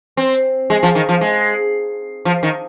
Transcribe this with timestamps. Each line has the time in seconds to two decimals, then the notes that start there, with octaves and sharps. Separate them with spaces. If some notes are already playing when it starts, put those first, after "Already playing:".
0.17 C4
0.70 G#3
0.83 F3
0.95 D#3
1.09 F3
1.21 G#3
2.25 F3
2.43 D#3